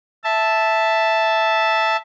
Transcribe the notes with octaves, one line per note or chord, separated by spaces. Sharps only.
E5 A5